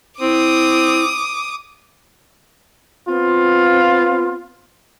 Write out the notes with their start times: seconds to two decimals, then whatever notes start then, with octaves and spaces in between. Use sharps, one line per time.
0.21 C4 E4 D6 D#6
3.08 B3 C4 F4